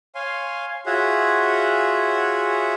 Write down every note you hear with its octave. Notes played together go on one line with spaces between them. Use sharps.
C#5 F5 G#5 C6
F4 F#4 G#4 C#5 E5 F#5